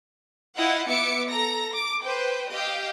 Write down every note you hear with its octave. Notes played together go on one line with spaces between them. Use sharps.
E4 F4 D#5 F5 F#5
B3 E5 D6 C#7
A4 A#5 A#6
D6
B4 C5 G5
G4 D#5 F5 G5